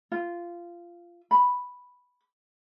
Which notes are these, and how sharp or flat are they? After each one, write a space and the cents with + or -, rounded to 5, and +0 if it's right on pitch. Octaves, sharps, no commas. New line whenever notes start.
F4 -15
B5 +0